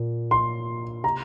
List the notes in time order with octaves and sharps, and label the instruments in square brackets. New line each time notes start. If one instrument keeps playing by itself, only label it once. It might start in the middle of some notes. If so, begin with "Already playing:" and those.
Already playing: [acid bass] A#2
[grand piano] C6
[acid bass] C3 [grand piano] A#5